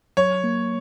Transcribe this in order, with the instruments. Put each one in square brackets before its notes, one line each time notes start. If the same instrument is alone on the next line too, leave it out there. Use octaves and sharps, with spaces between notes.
[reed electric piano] F#3 [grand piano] C#5
[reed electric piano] A#3